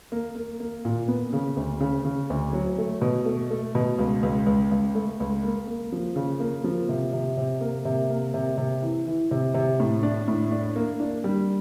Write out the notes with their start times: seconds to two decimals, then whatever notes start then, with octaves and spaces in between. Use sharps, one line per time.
0.12 A#3
0.35 A#3
0.60 A#3
0.85 A#2
1.08 B3
1.33 C#3
1.57 D2
1.81 C#3
2.05 C#3
2.30 D2
2.53 F#3
2.78 A3
3.01 B2
3.26 A3
3.50 A3
3.75 B2
3.99 C#2
4.23 C#2
4.46 C#2
4.71 C#2
4.95 A3
5.20 C#2
5.43 A#3
5.67 A#3
5.92 F3
6.16 C#3
6.40 A#3
6.64 F3
6.89 C3
7.13 C3
7.37 C3
7.61 A#3
7.85 C3
8.10 A#3
8.34 C3
8.57 C3
8.82 E3
9.07 E3
9.31 C3
9.54 C3
9.80 A2
10.03 D4
10.28 A2
10.51 D4
10.76 A#3
11.00 D4
11.24 G3